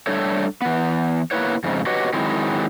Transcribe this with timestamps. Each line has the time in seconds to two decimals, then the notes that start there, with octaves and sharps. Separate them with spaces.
0.07 G3 A3 D4 A4 C#5
0.62 E3 B3
1.31 A#3 B3 C#4 E4 B4 C#5
1.64 F2 G#2 C#3
1.86 F#4 G4 B4 C#5 D#5 F#5
2.13 D#3 F#3 G#3 C4 D#4 E4